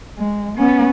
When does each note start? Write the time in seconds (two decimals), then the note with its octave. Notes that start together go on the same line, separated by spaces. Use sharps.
0.18 G#3
0.57 B3 C#4